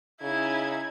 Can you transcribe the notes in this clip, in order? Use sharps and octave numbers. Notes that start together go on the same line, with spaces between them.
C#3 C#4 D#4 E4 G#6